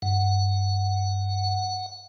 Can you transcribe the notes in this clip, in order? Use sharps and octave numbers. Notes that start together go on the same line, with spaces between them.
G2 F#5